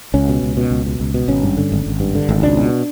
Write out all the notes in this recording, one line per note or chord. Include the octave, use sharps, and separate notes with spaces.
C#2 C#4
B2
C#2
B2
C#2
B2
C#2
B2
G#1 C#4
G2
D3
G#1
G#1
G2
D3
G#1
C#2 D4
B2